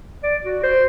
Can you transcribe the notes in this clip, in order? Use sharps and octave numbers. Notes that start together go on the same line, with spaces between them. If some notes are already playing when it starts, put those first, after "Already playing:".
D5
F#4
C5